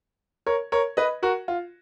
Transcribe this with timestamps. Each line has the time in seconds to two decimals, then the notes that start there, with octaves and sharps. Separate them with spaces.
0.46 A#4 C#5
0.72 A#4 C#5
0.97 B4 D#5
1.23 F#4 A#4
1.48 F4